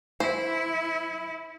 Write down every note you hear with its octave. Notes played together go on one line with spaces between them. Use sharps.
E4 C5